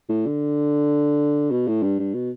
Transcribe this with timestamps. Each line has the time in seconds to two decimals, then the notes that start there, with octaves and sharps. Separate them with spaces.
0.09 A2
0.26 D3
1.51 B2
1.68 A2
1.83 G2
1.99 G2
2.14 B2